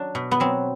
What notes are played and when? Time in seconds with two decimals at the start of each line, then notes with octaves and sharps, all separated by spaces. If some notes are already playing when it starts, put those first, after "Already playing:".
Already playing: F#3 D4
0.15 B2
0.31 B3
0.40 F#3 C4